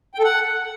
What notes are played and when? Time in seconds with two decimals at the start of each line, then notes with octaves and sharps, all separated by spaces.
0.14 G5
0.19 A4
0.24 F#5